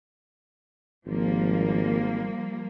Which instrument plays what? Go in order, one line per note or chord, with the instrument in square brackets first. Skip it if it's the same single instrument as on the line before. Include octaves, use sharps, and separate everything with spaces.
[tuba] G#1 [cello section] F3 G3 A#3